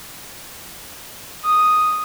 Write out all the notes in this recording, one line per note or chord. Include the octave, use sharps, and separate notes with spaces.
D#6